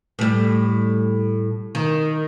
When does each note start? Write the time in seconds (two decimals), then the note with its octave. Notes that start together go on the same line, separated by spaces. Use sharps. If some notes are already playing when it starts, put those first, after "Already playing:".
0.19 A2 G3
1.75 D#3